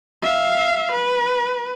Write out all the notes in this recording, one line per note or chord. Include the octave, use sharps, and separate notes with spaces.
E5 F5
B4